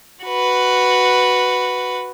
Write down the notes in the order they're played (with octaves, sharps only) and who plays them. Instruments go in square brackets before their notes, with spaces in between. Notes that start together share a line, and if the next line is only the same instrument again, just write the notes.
[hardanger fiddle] F#4 B4